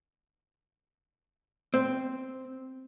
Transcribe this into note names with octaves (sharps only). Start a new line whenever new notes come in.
C4